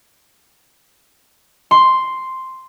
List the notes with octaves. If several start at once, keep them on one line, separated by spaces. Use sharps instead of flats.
C6